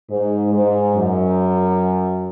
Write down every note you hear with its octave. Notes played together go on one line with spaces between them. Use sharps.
G#2
G#2
F#2